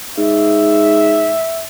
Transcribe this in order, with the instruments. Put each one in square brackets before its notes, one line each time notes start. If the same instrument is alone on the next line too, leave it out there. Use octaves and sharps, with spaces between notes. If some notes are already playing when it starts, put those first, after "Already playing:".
[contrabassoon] G#2 [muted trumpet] E5